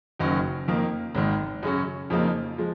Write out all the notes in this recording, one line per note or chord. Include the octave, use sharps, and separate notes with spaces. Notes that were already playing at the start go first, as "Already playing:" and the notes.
F#1 F#2 D#3 F#3 C#4
F2 D#3 A#3
G#1 G#2 D#3
F#2 C#3 F#3 C#4
F2 C#3 F3 A#3 D#4
F3 G#3